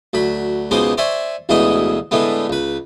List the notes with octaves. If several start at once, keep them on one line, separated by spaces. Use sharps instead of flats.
D2 F#3 B5
C#2 B2 G#3 D#4 C5 D6
C5 D5 E5 G#5 C#6
A1 D2 B2 G#3 E4 D#5
A2 D3 G#3 A3 B3
C#2 B4